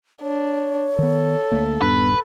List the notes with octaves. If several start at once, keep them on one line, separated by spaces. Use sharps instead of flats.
D4 C#5
D#3 B3 A4
D2 A3 A#3
D#1 G2 B3 D4 B4